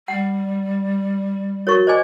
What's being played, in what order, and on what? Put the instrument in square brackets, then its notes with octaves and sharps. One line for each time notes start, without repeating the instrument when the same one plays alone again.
[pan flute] G3 [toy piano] F#5
[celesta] F#4 A#4 A6 [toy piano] C#5 C#6
[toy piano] C5 D5 G#5 [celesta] D#5 D6